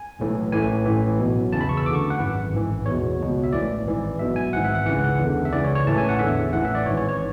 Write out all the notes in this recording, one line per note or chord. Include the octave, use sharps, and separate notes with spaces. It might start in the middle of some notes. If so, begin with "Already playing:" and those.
Already playing: G#5
B1 A2 E3
A1 A2 E3 G#5
A1 A2 E3
B1 B2
E2 C#3 E3 A5
B5
C#6
E6
D2 D3 C#6 D6
F#5
G#1 F#2 E3 B4
A1 G#2 E3
E2 B2 C#5
C#2 B2
E5
A1 A2 E3 D5
G#1 G#2 E3
B1 B2 E5
G#5
G#1 G#2 E3 F#5
E5
F#5
C#2 C#3 E3 F#5
E2 D3
E5
C#2 C#3 E3 D5
C#5
C#5
A1 A2 E3 A5
G#5
F#5
E2 D3 E5
A1 A2 E3 F#5
E5
D5
G#1 G#2 E3 C#5
C#5
C#5